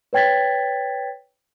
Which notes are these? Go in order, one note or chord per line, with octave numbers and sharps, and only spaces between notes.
B4 C#5 G5 G#6 A6 B6